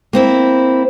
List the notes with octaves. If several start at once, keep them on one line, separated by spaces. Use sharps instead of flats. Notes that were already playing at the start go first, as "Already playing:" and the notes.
A#3 C4 E4